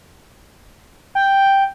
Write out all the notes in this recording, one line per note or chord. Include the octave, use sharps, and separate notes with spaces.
G5